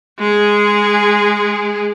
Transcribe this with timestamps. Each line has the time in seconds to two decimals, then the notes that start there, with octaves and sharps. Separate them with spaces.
0.19 G#3 G#4